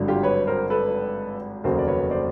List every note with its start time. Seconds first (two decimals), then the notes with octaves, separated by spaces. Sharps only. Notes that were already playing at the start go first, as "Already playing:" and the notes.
Already playing: G#1 G2 D3 F#3
0.08 F4 G4
0.23 B4 C#5
0.47 A#4 C5
0.70 A4 B4
1.64 F1 D#2 C#3 F#3 A#3 A#4 C5
1.79 D5
1.87 B4 C#5
2.11 C5 D5